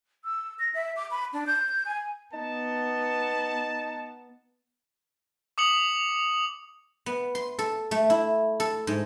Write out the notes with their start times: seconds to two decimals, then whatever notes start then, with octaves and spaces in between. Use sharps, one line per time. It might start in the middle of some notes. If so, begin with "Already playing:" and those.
0.24 E6
0.59 A#6
0.74 E5
0.96 D6
1.11 B5
1.33 D4
1.47 G6
1.86 G#5
2.33 B3 D#4 A5
5.58 D6 D#6 C#7 F#7
7.06 B3
7.35 C6
7.59 A4
7.91 A3
8.10 E4
8.60 A4
8.87 G#2